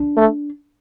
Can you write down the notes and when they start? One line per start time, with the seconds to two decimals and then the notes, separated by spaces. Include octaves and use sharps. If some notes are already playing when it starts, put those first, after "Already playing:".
Already playing: D4
0.17 A3